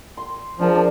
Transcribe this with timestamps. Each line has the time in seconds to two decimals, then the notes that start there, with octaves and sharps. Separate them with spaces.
0.17 C6
0.59 F3 D4 G#4 A#4
0.75 D4